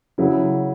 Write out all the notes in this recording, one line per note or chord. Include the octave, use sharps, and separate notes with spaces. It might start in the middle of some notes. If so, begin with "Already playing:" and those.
C#3 F#3 E4